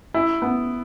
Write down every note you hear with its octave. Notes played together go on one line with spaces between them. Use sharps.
E4
B3